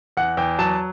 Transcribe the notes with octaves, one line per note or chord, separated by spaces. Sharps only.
E2 F#5
E2 G5
F#3 A5